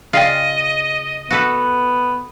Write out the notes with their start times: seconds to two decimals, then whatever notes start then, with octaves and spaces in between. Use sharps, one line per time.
0.13 C#3 F4 G#4 D5 D#5 G5
1.31 B3 F#4 A4 B4